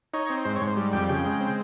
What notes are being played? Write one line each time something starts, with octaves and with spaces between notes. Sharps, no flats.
D#4 C#5
C4
G#2 C5
C#5
G#2
C5
G3
F2 G5
C#3 G5
G#3
C4